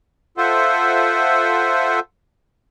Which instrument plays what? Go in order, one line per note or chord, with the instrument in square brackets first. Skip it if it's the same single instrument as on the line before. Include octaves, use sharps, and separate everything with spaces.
[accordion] F4 A4 C5 E5 F#5